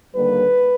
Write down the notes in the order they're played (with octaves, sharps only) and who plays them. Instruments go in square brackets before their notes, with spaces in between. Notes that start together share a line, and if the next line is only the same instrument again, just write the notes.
[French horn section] D#2 D3 G3 A#3 B4